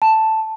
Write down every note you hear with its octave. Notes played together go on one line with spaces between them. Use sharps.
A5